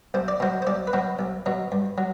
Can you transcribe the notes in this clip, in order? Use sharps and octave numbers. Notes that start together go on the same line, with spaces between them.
B1 C5
D5
B2 F#3 C5
C5
B1 D5
B4
B2 F#3 C5
B1
B2 F#3
G2
F#3